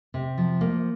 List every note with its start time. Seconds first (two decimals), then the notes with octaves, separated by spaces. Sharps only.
0.14 C3
0.38 F3
0.61 A#3